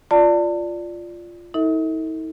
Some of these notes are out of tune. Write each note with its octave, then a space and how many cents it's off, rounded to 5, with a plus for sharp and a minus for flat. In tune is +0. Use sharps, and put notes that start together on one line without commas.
F4 -5 D5 +0 A5 +35
D#4 +45 A4 +30 E5 -40